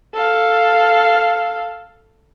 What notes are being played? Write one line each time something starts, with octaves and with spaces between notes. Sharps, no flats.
A4 F5